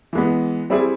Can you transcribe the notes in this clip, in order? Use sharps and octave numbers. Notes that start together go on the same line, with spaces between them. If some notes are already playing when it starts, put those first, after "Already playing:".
E3 G#3 B3
G3 C4 E4 G#4